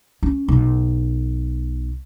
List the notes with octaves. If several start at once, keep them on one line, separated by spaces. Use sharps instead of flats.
C#4
B1